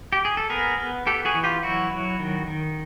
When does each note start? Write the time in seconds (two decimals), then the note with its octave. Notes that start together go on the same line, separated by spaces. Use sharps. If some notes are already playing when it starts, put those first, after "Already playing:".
0.13 G4
0.25 G#4
0.37 A4
0.50 B3 G#4 A#4
0.78 B3
1.06 B3 G4 A4
1.25 F#4 G#4
1.34 E3
1.44 F4 G4
1.63 F#3 E4 F#4
1.91 F#3
2.19 D#3
2.47 D#3